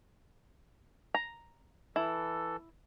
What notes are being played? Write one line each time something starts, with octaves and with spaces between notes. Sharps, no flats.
A#5
E3 E4 A4